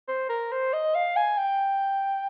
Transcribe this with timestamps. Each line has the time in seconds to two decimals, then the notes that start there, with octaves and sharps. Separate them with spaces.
0.09 C5
0.29 A#4
0.52 C5
0.73 D#5
0.95 F5
1.16 G#5
1.38 G5